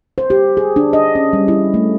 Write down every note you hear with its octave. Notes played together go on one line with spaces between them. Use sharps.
C5
G4
G#4
D4
D#5
C#4
G3
E4
A3